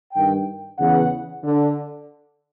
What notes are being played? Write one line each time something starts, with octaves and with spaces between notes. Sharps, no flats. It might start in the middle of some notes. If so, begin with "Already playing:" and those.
G2 D#3 G5
E2 C#3 E3 F#5
D3